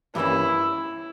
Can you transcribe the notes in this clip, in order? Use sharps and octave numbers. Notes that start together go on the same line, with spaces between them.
G2 E3 G3 A#3 C#4 E4